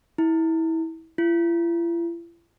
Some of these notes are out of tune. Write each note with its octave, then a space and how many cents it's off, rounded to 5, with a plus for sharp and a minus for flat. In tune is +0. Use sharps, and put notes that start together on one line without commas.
E4 -25
E4 +45